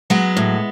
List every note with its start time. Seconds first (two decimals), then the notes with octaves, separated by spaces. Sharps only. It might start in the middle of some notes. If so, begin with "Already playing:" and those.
0.10 F#3 G#3 B3
0.37 A2